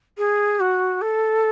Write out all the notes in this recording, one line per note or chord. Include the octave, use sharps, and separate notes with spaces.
G#4
F#4
A4